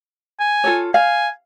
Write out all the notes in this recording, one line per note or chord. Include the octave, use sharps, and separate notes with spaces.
G#5
F4 A4 C#5
F5 G#5